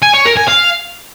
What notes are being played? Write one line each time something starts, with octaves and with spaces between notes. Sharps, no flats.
G#5
C#5
A#4
G#5
F5